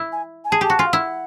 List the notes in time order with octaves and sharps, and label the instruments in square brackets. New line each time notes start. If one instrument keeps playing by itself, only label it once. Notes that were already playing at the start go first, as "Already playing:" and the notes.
Already playing: [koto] E4
[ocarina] G#5
G#5
[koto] G#4 [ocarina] A5
[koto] G4 [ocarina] A5
[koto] F#4
[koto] F4 [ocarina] G#5
[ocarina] F5
[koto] E4 [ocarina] F#5